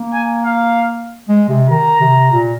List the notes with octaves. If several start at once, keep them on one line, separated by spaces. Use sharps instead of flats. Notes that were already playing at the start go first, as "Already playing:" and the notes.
Already playing: A#3
G#5
F5
G#3
C3
D#3 A#5
C3
A#2